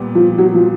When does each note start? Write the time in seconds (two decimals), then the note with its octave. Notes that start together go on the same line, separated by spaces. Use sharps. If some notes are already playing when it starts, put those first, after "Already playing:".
Already playing: A#2 G3 B3
0.15 F3
0.38 F#3
0.54 F3